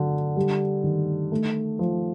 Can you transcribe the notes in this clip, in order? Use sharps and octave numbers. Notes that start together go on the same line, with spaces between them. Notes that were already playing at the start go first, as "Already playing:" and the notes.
Already playing: D3 F#3
G3
D#3
A3
F3